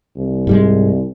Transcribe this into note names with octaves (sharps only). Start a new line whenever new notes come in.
C2
G#2 G3 G#3